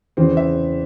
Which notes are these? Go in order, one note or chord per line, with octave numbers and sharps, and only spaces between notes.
E2 C#3 E3 C4
E5